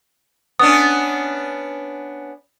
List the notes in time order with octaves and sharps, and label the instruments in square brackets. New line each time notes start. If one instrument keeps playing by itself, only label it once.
[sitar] B3 C#4 D4 [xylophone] D#6